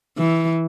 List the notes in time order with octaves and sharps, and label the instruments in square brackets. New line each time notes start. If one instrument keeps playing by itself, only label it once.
[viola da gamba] E3